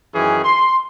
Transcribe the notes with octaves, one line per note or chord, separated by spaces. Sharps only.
F#2 D#3 E3 C#4 G#4
C6